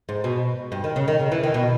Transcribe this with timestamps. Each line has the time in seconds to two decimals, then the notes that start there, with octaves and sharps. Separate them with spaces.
0.09 G#2
0.24 B2
0.72 G2
0.84 D#3
0.96 C#3
1.08 D#3
1.19 C#3
1.32 E3
1.43 D#3
1.54 B2